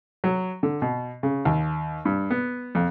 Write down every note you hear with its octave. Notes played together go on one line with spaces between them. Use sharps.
F#3
D3
B2
C#3
D#2
G2
B3
F2